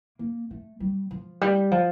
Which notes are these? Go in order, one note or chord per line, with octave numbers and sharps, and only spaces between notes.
A#3
A3
G3
F3
G3
F3